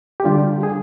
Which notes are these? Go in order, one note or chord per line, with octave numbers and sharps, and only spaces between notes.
G4
D3 G3 D4 F4
G#4